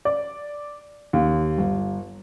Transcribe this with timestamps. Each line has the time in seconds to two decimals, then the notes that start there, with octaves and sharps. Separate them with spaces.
0.05 D5
1.13 D#2
1.58 G1